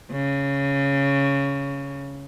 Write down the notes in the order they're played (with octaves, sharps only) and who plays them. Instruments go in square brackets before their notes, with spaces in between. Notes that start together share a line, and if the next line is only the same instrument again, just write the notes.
[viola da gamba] C#3